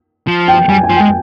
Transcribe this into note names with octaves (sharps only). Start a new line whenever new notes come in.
F3
G5
G3 G#5
G#5
F3
G#3 G5